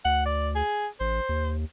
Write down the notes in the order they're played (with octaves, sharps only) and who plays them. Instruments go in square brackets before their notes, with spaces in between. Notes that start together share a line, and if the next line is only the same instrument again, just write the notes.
[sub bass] D2 [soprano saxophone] F#5
[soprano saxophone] D5
G#4
[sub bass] A1 [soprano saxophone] C5
[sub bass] D#2